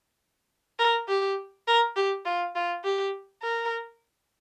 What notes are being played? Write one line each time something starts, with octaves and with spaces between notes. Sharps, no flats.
A#4
G4
A#4
G4
F4
F4
G4
A#4